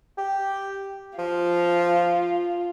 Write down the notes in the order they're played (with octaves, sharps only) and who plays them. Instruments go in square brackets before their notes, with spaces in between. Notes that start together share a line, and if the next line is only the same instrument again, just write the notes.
[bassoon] G4
[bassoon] F3 [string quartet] F4